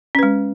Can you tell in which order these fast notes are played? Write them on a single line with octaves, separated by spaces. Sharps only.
C#4 B4 G#3